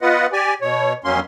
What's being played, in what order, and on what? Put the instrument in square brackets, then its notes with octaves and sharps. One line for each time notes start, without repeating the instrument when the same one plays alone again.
[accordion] B3 F4 B4 D#5 F#5
G4 D5 G#5
B2 C#5
F2 F#3 A#3 C#4 C6